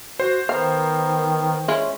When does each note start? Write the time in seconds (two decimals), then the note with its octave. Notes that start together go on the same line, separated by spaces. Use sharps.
0.20 F#4 C5
0.49 D#3 B3 A#4 F5
1.68 G#3 C#4 E4 F4